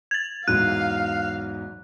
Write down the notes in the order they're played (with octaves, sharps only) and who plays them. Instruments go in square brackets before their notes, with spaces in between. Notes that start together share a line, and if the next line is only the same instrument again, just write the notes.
[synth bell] G#6 A6
[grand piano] E2 G#2 F#3 [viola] F5 [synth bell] F#6